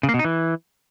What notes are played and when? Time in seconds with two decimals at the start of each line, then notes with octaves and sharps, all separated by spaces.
0.03 C#3
0.09 A#3
0.14 B2
0.19 D#4
0.24 E3